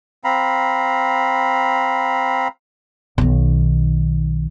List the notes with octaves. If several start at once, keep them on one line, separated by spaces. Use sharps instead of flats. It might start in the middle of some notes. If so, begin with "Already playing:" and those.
C4 F5 A#5 B5
B1 D#3